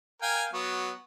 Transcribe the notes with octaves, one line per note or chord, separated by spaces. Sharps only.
A#4 F5 G5 G#5
F#3 B3 F#4